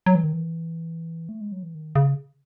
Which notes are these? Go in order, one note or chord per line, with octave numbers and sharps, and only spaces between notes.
F#3
E3
D#3
E3
A3
G#3
F#3
E3
D#3
C#3